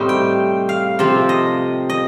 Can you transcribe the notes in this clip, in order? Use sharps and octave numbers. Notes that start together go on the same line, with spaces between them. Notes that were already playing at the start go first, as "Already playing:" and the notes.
Already playing: A2 C3 G3 C4 D#4
G5
F5
C3 F3 C4
D#5
D#5